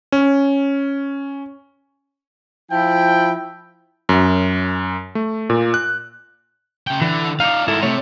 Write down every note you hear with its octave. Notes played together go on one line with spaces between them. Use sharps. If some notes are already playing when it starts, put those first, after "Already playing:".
C#4
F3 E4 G5
F#2
A3
A#2
F#6
C#3 G5
D3 E3 D4
D#4 D5 F5
G#2 E4 A4 A#4
C3 A3 C#5